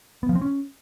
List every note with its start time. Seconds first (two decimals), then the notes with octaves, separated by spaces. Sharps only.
0.23 B3
0.29 F3
0.35 C4
0.42 C#4